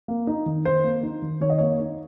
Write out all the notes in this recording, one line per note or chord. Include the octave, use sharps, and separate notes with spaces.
A#3
D#4
D#3
D#3 C5
A#3
D#4
D#3
D#3 C#5
D#5
A#3 C#5
D#4